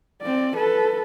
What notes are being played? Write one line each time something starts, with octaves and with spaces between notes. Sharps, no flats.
C4 D5
A4 B4